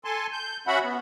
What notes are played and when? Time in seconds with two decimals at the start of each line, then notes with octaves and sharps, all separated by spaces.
0.05 A4 G#5 A5 C6
0.32 G6
0.67 C#4 F#4 E5 F#5 B5
0.84 B3